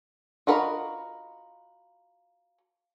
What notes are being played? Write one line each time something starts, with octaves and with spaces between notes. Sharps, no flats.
F4 F#4 A#4 B4 D#5